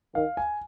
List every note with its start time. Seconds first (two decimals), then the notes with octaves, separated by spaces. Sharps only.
0.15 D#3 F5
0.37 G#5